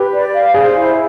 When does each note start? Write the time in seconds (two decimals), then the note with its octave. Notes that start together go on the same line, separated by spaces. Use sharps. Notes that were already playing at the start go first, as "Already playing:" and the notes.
Already playing: G4 B4
0.13 D5
0.34 F5
0.54 G#4 C5
0.75 E4